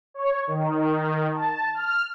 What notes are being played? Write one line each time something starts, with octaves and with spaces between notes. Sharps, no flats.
C#5
D#3
A5
F6